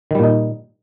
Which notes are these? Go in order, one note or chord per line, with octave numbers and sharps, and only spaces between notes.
A#2 D#3 G3 D#4